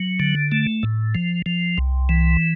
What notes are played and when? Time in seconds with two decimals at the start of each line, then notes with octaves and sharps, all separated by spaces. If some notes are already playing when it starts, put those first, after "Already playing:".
Already playing: F#3
0.20 D3
0.52 A3
0.83 A2
1.15 F3
1.46 F3
1.78 C2
2.09 E3